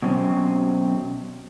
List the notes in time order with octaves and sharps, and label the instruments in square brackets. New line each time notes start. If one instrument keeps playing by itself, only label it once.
[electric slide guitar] B2 F#3 C4 C#4